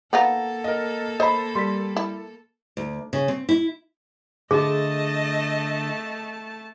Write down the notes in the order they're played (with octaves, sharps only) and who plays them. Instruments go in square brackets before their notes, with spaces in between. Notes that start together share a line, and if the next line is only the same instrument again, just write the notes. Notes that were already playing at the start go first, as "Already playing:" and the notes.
[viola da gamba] A#3 A4 [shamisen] B3 D#4 F4 [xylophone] F#5 A#5 A#6
[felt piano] A#4 D#5
[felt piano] C5 B5 [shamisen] D#5
[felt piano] G3 [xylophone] C6 B6
[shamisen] E4
[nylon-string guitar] D2
C#3
C4
E4
[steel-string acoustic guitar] D3 [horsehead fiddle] A3 A5 [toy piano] G#4 [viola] D#5